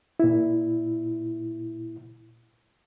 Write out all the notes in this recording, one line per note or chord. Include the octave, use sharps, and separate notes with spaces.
A#2 E4